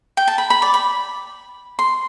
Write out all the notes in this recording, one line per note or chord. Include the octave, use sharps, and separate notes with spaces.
G5
A5
B5
B5
D5
B5
C6